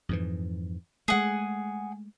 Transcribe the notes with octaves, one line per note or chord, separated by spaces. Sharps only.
F2 G#2 E3
G#3 A3 G#4 F#5